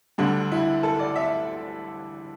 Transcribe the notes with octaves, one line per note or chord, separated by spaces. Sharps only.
D2 D3 G3 D4
E4
A4
D5
E5